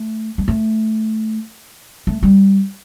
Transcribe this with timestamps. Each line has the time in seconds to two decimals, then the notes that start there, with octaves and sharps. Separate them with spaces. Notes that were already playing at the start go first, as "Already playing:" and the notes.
Already playing: A3
0.38 G#3
0.48 A3
2.07 A3
2.23 G3